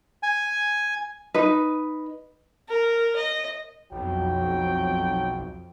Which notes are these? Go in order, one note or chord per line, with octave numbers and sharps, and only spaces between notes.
G#5
D#4 B4
A#4
D#5
B1 F2 F#3 G5